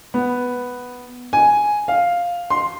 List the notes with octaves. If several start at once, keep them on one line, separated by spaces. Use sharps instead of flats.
B3
G#5
F5
C6